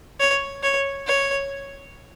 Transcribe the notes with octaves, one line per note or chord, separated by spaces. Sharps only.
C#5
C#5
C#5